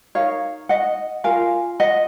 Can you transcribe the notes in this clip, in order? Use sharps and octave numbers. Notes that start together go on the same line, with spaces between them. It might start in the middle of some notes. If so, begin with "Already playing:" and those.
D#4 A#4 C#5 F5
D#5 F#5
F4 A#4 F5 G#5
D#5 F#5